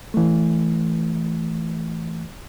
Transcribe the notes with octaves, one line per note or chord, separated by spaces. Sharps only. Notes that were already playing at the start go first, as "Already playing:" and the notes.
E3 A3